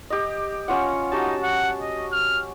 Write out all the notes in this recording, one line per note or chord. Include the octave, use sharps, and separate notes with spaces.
G4 D#5
C#4 F4 F#5
D#4 F#4 G4 A5
F#5
D#5
F6